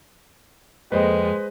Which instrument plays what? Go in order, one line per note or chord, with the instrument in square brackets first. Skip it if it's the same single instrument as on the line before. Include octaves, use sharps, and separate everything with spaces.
[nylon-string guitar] F2 A#3 [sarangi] G#3 [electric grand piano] B4 C5 D#5